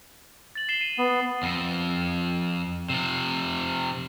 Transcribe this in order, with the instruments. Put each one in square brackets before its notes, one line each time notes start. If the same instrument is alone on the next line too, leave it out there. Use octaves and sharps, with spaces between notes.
[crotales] A6 F#7
C7 E7 G7
D#7
[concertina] B3
[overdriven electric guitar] F2
C3 F3